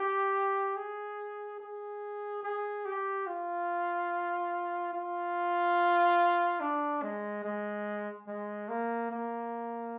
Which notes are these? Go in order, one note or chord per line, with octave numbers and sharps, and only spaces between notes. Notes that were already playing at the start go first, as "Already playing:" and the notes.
Already playing: G4
G#4
G#4
G#4
G4
F4
F4
D4
G#3
G#3
G#3
A#3
A#3